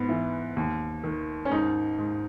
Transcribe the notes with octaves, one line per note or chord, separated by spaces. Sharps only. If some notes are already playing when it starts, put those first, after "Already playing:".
Already playing: G#2 B3
E3
D#2
D#3
C#4
G#2 D#4
G#2